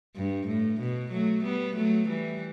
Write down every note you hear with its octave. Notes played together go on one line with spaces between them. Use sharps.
G2
A2
B2
F#3 A3
G3 B3
F#3 A3
E3 G3